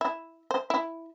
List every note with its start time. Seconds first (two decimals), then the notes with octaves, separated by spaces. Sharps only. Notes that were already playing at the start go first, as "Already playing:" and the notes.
0.01 E4
0.51 C5
0.70 E4